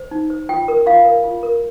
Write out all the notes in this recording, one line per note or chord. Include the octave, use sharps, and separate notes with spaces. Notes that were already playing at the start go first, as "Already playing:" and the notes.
Already playing: C5
D#4
C5
F4 G5
A#4
F4 F5
A#4
F4
A#4